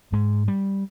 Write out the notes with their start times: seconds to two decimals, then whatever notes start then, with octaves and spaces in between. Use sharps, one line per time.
0.12 G#2 G#3
0.48 G3